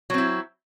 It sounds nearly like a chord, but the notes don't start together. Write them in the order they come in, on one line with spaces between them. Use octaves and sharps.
F#3 C4 E4